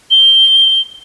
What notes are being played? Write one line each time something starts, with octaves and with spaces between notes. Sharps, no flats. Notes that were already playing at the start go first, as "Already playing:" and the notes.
G7